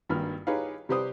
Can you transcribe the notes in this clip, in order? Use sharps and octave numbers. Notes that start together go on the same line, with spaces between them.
G#1 G2 A#3 B5 F6
D#4 G4 G#4 B4 C#5 F5
C3 G3 G4 B4 C5 D#6